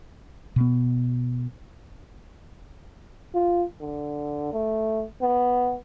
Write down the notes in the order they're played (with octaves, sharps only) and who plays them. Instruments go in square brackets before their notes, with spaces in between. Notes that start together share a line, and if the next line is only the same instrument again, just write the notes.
[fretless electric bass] B2 B3
[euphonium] F4
D3
A3
B3